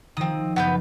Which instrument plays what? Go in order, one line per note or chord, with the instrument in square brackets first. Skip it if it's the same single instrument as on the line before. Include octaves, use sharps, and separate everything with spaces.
[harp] D#3 F3 [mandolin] C4 D#6
[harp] F#1 [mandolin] B3 B4 G6